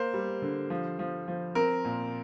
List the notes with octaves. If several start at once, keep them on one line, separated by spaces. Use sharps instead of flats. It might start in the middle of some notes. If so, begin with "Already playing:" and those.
Already playing: A#3 C5
G3
D3
F3
F3
F3
C4 A#4
A#2